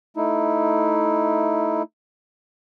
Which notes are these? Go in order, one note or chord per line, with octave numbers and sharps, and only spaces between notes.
A3 D#4 E4